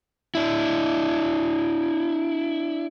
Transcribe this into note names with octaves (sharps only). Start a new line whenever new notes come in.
D4 E4